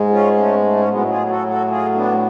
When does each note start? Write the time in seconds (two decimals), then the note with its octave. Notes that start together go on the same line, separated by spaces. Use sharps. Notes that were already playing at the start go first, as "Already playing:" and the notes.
Already playing: G#2 G#3
0.10 C#4 F4
0.36 A3 C#4
0.56 B3
0.62 A3
0.77 C#4
0.88 A2 F#3 G#3 B3
1.09 F4 G#4
1.29 F#4 A4
1.48 F#4 A4
1.68 F4 G#4
1.94 B3 D4
2.12 A3